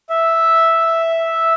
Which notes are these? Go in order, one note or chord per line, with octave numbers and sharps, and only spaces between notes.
E5